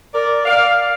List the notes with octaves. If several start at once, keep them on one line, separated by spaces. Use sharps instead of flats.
A#4 D5
D5 F5